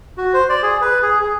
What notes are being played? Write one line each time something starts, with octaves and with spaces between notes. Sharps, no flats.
F#4
C5
D5
G#4
B4
G#4
G#4